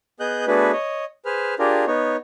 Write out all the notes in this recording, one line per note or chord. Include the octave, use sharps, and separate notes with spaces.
B3 G#4 D#5 F#6 G6
A3 B3 D4 F#4 G#4 B4
C#5 D#5
G#4 B4 C5 F6
D4 F4 G4 G#4 A#4
B3 D#4 C#5